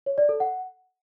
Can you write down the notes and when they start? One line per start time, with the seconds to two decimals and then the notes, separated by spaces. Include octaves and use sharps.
0.06 C#5
0.18 D5
0.29 A4
0.40 F#5